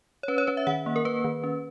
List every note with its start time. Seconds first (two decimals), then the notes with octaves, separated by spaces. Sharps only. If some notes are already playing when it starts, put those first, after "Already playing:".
0.23 C#5
0.28 C#4 B4
0.38 C#5
0.47 C#4 B4
0.57 E5
0.67 D#3 F#5
0.86 A#3
0.96 A#4
1.05 A#3 B4
1.24 D#3
1.44 C#4